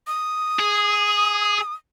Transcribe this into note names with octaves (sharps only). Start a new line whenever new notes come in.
D#6
G#4